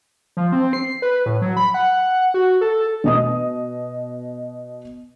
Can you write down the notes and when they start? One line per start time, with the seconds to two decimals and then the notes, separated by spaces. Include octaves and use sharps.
0.37 F3
0.52 C4
0.73 C7
1.02 B4
1.26 A2
1.42 F#3
1.57 B5
1.74 F#5
2.34 F#4
2.61 A4
3.04 B2 D#5 D#6